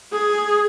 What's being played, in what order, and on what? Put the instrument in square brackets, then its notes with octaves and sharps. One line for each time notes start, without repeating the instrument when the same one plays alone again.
[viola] G#4